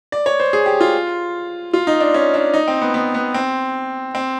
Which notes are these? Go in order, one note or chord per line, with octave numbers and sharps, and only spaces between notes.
D5
C#5
C5
G#4
G4
F4
F4
D#4
D4
C#4
D4
D#4
C4
B3
B3
B3
C4
C4